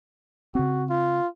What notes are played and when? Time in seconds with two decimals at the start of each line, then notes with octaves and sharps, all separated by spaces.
0.55 C#3 C4 F#4
0.89 F4